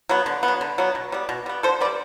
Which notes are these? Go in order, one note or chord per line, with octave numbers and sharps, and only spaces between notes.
F#3 B3
D3
B3
F#3
D3
F#3 B3
B2
G3 B3
B2
G3 B3
D3 A4 C5
B3 B4 D5
G3